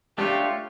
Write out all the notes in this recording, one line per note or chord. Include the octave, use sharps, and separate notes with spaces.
A3 D4 F4 G4 C#5